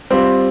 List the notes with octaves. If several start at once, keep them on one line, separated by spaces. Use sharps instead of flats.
G3 C4 F4